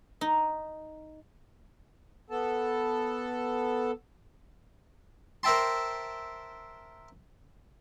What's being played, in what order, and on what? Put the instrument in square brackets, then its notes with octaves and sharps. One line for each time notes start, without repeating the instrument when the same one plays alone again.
[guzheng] D#4
[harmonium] B3 A4 A5
[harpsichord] A#4 C5 E5 G5 A5 C6